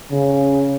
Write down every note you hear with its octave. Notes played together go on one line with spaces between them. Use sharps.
C#3